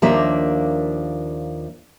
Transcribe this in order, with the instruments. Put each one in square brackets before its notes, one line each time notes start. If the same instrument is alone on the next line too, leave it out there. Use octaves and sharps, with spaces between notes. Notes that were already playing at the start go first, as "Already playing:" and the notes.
[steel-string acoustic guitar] D#2 F3 A#3 D4 E5 A#5